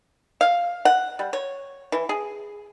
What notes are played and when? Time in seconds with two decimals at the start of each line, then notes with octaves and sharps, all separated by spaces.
0.41 F5
0.85 F#5
1.19 G3
1.33 C#5
1.92 E3
2.09 G#4